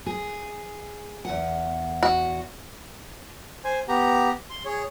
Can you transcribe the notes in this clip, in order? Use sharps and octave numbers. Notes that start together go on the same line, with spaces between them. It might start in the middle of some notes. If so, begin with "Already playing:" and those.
G#4
E2 F#5
F#4
C5 G#5
B3 G4 A#5
C6
G#4 C#5